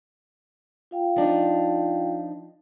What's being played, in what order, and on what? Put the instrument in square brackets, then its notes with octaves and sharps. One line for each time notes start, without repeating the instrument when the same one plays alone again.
[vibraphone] F4 F5 G5
[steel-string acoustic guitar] F3 D4 D#4